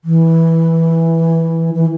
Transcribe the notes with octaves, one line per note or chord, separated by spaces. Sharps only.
E3
E3